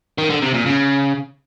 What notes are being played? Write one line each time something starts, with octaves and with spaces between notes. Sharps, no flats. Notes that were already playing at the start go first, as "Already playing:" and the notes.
D#3
D3
C3
A#2
C#3